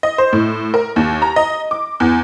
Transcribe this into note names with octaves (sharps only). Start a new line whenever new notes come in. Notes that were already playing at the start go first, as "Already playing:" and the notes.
D#5
C5
A2
A#4
D#2
A#5
D#5
D6
E2